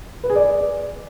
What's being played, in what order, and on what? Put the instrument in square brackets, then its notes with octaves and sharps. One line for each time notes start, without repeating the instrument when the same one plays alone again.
[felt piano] B4
G#4
D5